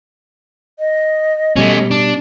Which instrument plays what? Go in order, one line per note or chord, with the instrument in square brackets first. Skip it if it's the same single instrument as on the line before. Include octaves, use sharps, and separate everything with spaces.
[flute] D#5
[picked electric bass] B2 G3 [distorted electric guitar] A3 C#4
[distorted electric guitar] D4